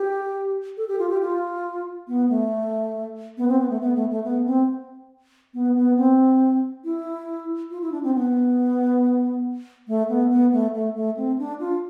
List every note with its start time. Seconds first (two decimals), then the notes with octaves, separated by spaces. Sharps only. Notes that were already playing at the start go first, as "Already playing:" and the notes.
Already playing: G4
0.77 A4
0.88 G4
0.99 F4
1.10 G4
1.21 F4
2.08 B3
2.29 A3
3.37 B3
3.48 C4
3.59 B3
3.70 A3
3.81 B3
3.95 A3
4.10 A3
4.24 B3
4.46 C4
5.54 B3
5.76 B3
5.97 C4
6.84 E4
7.71 F4
7.82 E4
7.92 D4
8.03 C4
8.14 B3
9.88 A3
10.09 B3
10.30 B3
10.52 A3
10.74 A3
10.95 A3
11.17 C4
11.38 D4
11.60 F4